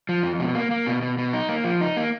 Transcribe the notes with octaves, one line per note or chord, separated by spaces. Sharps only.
F3
F2
B2
A#3
A#3
B2
B2
B2
D#4
A#3
F3
D#4
A#3